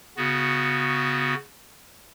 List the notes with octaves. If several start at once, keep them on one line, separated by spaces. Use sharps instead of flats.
C#3 B3 F#4